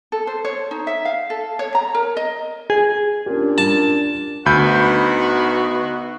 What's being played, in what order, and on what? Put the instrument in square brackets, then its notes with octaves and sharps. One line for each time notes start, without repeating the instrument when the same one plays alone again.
[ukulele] A4
C5
C#5
D#4
E5
F5
A4
C#5
A#5
A#4
D#5
[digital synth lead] G#4
[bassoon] A#2 [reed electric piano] C#4 G4 [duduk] D4
[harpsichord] A5
[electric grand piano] D2 B5 G6 [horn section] B3 D#4 F#4